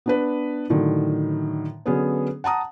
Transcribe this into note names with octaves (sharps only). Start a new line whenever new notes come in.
B3 D4 B4
A2 D3 D#3 F#3
D3 F#3 B3 C#4 G#4 B4
F#5 A5 A#5 D#6